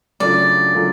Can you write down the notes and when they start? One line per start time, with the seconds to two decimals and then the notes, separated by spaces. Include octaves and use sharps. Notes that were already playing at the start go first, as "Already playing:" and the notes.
0.20 C#3 F#3 A3 D4 F4 D5
0.74 C#3 F#3 A3 D4 F4